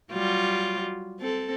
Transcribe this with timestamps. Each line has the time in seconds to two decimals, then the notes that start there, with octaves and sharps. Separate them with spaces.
0.12 F#3 G3 F4
1.20 C4 A4